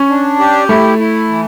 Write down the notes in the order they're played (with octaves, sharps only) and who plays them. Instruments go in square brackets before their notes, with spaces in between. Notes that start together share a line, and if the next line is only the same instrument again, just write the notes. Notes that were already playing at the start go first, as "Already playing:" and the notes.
Already playing: [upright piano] C#4
[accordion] D4
G4
[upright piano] A3 [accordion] E4
[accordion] E4
E3